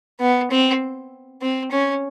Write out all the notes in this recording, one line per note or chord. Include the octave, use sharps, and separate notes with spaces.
B3
C4
C4
C#4